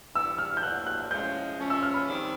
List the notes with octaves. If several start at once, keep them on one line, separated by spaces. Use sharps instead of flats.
E3 G3 B3 D4 E6
F6
G6
A2 F#3 A#3 D4 F#4 F#6
F#6
A2 F3 G#3 C#4 G6
F3 A3 C#4
E6
F6
B5
D#3 G3 C4